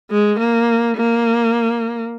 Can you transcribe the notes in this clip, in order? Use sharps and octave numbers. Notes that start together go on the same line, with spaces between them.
G#3
A#3
A#3